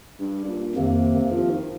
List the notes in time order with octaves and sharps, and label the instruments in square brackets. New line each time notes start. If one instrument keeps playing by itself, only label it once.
[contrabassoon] G2
G2
A#2
[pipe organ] F2 D#3 A#3 [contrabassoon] C3
[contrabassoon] F3
D#3